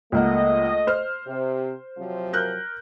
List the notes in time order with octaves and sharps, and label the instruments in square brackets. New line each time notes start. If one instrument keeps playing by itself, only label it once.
[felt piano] C#2 A#3 F#5 [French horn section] A3 D#5
[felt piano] C5 F6
[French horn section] C3
C3 F3 F#3
[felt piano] A#4 F#6 G6